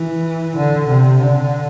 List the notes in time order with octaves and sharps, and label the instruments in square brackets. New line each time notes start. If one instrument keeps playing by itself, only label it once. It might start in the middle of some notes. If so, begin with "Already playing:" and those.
Already playing: [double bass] E3
D3
C3
D3